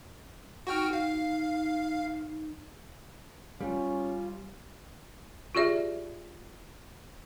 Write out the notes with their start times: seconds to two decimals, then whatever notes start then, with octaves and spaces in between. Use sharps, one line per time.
0.67 D#4 F#4 G5 F6
0.93 F5
3.61 G3 C#4 F4
5.55 F4 G4 G#4 D5 E5